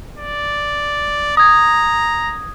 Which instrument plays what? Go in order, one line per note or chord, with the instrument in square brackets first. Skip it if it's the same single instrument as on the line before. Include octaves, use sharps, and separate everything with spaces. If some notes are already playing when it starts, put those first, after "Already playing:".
[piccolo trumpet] D5
[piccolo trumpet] A#5 [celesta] D#6 G#6